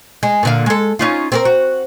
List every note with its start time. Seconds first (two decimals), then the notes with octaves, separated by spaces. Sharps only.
0.23 G#3
0.43 A#2 D3 F5
0.66 G#3 A4
0.99 C#4 D#4 F4
1.32 C4 G4 A#4
1.45 F#4